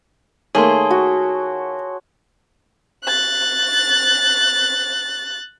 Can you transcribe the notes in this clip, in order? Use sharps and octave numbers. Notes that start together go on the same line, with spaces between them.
D#3 A3 A#3 G#4 C#5 A5 C6
F#4
F#6 A6